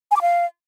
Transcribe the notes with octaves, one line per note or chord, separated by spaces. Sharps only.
G#5
D6
F5